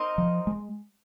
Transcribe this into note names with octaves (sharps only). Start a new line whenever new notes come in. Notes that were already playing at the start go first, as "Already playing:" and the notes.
Already playing: C4 D#4 A#4 D#5
F3
G#3